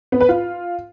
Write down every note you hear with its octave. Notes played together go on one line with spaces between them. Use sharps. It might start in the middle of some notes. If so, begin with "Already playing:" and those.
B3
B4
F4